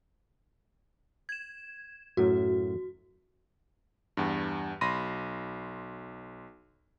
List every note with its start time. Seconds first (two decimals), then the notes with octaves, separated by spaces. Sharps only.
1.29 G#6 E7
2.17 F#2 A2 F#3 F#4
4.17 E2 G2
4.81 B1 B5 C6 A#6 D#7